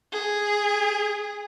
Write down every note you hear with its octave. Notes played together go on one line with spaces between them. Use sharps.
G#4